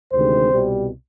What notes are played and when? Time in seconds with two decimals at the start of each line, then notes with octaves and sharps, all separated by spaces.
0.13 D2 C3 D#3 G#3 C4 C5
0.52 C2 B2 G3